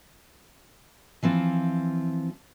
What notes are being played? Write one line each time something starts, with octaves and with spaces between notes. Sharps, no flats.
E3 F3 C4 F4